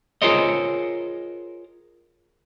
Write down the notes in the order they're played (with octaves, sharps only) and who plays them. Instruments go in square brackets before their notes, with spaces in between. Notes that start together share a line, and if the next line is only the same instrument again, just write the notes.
[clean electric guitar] F4 G#4 A#4 C5 C#5 D#5